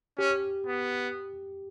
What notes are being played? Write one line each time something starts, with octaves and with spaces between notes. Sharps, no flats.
C#4 G4
B3